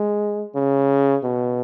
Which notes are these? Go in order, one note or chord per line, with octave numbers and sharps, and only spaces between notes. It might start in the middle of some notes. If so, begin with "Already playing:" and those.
Already playing: G#3
C#3
B2